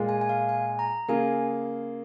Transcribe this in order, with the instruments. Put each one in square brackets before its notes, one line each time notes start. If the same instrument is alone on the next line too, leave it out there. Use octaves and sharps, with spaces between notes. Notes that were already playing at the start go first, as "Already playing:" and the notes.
Already playing: [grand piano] A#2 G#3 F4 G#4
[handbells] G#5
G#5
F5
G#5
A#5
[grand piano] C#3 A#3 F4 G#4 [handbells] G#5